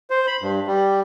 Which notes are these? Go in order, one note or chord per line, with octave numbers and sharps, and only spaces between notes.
C5
B5
G2
G3